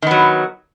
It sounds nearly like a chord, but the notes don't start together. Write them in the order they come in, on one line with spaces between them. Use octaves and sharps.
D#3 B3 F#3